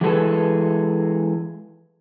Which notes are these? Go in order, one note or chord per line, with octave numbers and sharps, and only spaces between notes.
E3 G#3 F#4 G#4 A4 B4